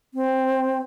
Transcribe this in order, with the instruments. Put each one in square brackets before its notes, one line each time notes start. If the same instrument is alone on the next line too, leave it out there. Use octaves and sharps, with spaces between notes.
[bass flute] C4